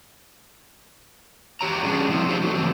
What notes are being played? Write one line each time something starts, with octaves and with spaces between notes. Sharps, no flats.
E2 G4 C#5 A#5
G3 C#4 D4 G#4
C3 F3 C4 E4
F3 D#4 G4 C5
F#3 A3
F2 C#3 E3 C4